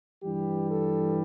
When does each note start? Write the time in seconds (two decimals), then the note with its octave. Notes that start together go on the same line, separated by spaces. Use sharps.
0.23 G2 E3 G3 G4
0.70 A4